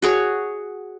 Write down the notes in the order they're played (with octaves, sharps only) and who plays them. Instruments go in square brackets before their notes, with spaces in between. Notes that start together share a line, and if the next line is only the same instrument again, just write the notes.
[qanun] F#4 G#4 C#5